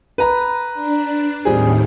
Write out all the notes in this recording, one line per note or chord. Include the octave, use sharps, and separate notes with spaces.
B4 A#5 B5
D4
D#2 A2 D#3 G3 C4 G#4